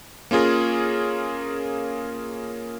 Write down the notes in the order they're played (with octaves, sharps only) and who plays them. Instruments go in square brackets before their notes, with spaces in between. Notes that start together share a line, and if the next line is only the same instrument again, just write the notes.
[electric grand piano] A#3 C#4 F4 G#4 A#4